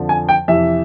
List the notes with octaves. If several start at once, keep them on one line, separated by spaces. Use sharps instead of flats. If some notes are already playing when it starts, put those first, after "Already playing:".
Already playing: F2 D3 F3
G#5
G5
F2 C3 E3 E5